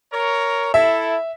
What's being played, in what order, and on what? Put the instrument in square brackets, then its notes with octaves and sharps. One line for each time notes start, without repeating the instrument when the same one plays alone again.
[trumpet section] A#4 C#5
[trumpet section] E4 A4 [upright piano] E5